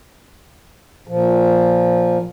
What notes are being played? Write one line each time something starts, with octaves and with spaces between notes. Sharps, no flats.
A#2 F3